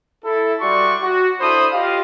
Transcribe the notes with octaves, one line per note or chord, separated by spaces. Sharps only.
E4 A4
G3 F#4 D5 E5 C6 C#6
F#4
D4 E4 A4 C5 B5 D#6
F4 G4 D#5 F5